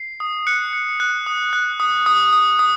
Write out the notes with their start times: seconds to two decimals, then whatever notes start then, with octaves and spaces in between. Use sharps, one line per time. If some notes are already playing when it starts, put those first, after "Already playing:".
Already playing: C7
0.20 D#6
0.47 F#6 C#7
0.73 F#6
1.00 F#6
1.26 D#6
1.53 F#6
1.80 D#6
2.06 D#6
2.33 D#6
2.59 D#6